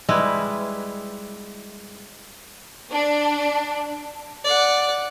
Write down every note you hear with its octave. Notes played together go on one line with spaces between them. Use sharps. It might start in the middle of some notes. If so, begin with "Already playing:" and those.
G3 G#3 E4 B4
D4
D5 F#5